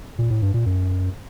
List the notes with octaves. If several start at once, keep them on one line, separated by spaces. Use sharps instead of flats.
A#2
A2
G2
A#2
F#2